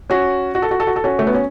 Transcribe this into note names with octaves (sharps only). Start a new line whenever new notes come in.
C#4 F#4
F#4
A4
F#4
A4
F#4
A4
C#4 F#4
A3
B3
C#4